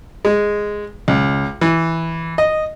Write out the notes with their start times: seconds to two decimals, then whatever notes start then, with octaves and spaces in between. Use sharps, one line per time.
0.25 G#3
1.08 C#2
1.61 E3
2.38 D#5